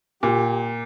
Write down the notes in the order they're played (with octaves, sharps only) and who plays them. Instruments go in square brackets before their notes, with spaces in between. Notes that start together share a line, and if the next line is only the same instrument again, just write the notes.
[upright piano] A#2 [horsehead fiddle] G4